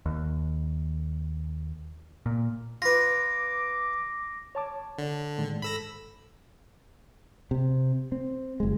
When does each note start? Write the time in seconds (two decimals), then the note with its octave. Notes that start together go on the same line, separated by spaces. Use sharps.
0.06 D#2
2.26 A#2
2.82 F4 B4 D6 A#6
4.55 C#5 A5 D6
4.98 D3
5.38 A2 D#3 G#3
5.62 G#2 A4 B5 E6 A#6
7.51 C3
8.12 C4
8.60 F#1 G#3